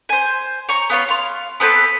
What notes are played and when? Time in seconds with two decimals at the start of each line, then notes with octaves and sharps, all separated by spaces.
0.09 C5 G#5
0.69 C#5 A#5 C6 C#6
0.90 B3 F4 C#5
1.09 F5 C6
1.60 B3 C4 A4 B4